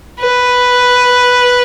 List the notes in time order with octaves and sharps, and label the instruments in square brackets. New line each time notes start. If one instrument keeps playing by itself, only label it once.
[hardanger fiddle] B4